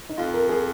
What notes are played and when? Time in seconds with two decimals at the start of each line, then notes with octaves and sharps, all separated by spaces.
0.09 D#4
0.18 F2 F4
0.33 A#4
0.49 G#4